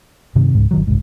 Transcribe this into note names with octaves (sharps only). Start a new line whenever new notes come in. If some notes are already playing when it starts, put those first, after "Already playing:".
G2 C3 D#3
C#2 G#2
G1 D#3 F#3
F#1 C2 G#2